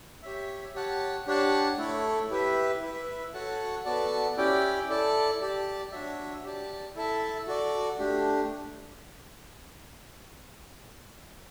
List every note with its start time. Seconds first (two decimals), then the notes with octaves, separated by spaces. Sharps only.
0.23 G4 C#5 E5
0.74 G4 C#5 F#5 A5
1.27 D4 G4 C#5 F#5 A5
1.78 A3 E4 A4 C#5
2.30 E4 G4 B4 E5
2.81 E4 B4 E5
3.33 F#4 A4 C#5 F#5 A5
3.85 B3 F#4 A4 D5 A5
4.37 C#4 E4 G4 D5 G5
4.89 E4 A4 D5 A5
5.41 G4 D5 A5
5.92 D4 F#4 C#5 E5
6.43 G4 D5 A5
6.95 E4 A4 E5 A5
7.47 F#4 A4 D5
7.99 A3 D4 G4